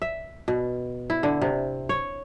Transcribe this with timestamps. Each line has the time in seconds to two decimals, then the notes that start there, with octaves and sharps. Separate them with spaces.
0.02 E5
0.48 B2
1.10 E4
1.23 D3
1.41 C3
1.89 C#5